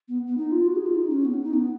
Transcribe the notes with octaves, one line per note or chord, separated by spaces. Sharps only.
B3
B3
D#4
F4
F#4
G#4
F4
D#4
C#4
B3
C#4
D#4
B3